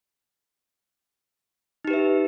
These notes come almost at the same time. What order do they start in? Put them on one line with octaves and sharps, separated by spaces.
D#4 G4 B4 E5